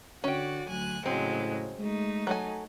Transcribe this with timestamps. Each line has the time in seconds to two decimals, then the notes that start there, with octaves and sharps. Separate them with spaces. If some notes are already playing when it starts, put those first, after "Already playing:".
0.24 D3 C#4 F#4 D5 G5
0.67 D2 F#3 G#5 F#6
1.06 A2 C#3 F#3 G#3 C4
1.79 G#3 A3 D#4
2.27 F#3 A4 G#5